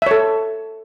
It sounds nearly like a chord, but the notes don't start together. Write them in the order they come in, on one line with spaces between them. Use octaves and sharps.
E5 C#5 A4